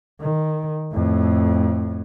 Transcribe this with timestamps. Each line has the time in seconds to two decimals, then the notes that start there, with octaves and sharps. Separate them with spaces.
0.21 D#3
0.93 F2 A2